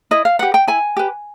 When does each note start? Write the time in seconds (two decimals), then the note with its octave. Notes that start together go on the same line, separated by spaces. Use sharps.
0.11 E4 D#5
0.25 F5
0.39 G4 B4 F#5
0.54 G5
0.67 E4 G#5
0.97 G4 B4